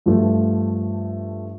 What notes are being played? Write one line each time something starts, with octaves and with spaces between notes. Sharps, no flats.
G2 F3 A3